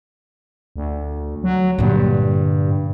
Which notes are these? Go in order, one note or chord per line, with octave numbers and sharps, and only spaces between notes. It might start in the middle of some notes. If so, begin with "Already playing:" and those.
D2
F#3
G2 A#2 D3